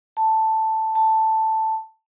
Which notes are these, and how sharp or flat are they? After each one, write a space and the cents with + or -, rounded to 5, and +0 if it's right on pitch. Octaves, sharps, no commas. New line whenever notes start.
A5 +5
A5 +5